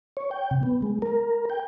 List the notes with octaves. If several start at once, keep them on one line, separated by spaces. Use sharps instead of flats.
C#5
G5
C3
B3
G#3
A#4
G5